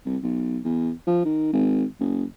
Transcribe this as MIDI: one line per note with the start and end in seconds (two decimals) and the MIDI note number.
0.06 0.18 36
0.23 0.59 35
0.65 0.91 40
1.07 1.22 53
1.25 1.49 51
1.53 1.84 32
2.00 2.24 30